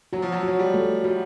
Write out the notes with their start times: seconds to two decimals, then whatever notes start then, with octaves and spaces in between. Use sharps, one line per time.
0.13 F#3 F#4
0.22 F3
0.32 F#3
0.43 F#3 F#4
0.59 G3
0.74 A3
1.04 G3 F#4